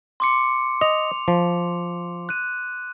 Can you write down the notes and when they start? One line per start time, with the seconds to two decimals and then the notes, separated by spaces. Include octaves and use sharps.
0.20 C6 D6 C#7
0.81 D#5 F7
1.28 F3
2.29 F#6 D#7